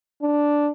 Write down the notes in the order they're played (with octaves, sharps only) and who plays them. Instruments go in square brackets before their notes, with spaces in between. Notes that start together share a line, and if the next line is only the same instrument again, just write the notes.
[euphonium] D4